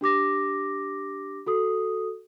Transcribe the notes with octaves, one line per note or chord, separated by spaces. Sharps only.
D4 G4 D6 A#6
F#4 A4 D#6